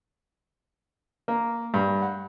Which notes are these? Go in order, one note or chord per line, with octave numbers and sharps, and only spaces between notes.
A#3
G2
F#5